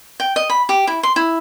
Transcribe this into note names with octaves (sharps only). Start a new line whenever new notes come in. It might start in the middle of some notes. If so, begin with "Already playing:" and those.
G5
D#5
B5
G4
E4
C6
E4